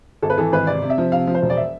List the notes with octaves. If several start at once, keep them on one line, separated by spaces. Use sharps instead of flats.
G#1 A4
B4
E3 A4
G#1 B4
C3 D5
C3
E5
F3
C3 F5
F3
C5
E1
D5
E5